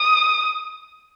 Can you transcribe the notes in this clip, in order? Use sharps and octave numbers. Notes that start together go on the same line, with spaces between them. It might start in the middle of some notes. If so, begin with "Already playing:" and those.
Already playing: D#6